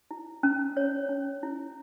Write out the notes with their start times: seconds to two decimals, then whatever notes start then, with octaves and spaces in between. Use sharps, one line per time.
0.11 E4
0.43 C#4
0.77 C#5
1.09 C#4
1.43 E4